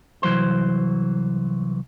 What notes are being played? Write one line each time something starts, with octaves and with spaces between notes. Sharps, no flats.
C2 E3 F#3 C5 C6